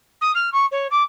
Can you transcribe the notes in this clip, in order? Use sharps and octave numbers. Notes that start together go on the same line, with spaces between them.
D#6
F6
C#6
C#5
D6